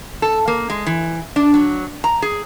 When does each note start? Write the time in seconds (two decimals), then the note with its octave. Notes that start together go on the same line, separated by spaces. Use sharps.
0.22 A4
0.48 A#3
0.70 G#3
0.87 E3
1.36 D4
1.54 F#3
2.04 A#5
2.22 G#4